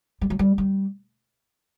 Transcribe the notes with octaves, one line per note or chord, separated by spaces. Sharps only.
G3
F#3
G3
G3